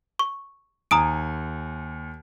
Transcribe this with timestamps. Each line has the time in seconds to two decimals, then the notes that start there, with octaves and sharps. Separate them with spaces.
0.19 C#6
0.91 D#2 G#5 A#5 D#6 D7